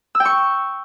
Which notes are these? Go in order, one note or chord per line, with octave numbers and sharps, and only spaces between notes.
E6
G5
C#6